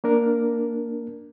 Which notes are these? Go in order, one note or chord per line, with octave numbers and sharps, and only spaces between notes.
A#3 D4 A#4